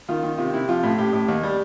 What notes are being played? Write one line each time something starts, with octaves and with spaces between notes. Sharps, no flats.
D#3 F4
D#3
C3 F4
C3 E4
F3 F4
A2
A2 G4
A2
D#2
G3